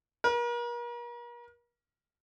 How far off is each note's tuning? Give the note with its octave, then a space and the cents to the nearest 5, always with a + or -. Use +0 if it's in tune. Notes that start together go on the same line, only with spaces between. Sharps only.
A#4 +40